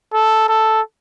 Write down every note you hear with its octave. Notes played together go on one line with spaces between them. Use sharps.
A4
A4